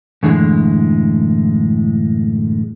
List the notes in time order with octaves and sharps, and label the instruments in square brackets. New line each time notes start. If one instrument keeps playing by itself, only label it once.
[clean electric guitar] F#2 A2 D3 E3 G#3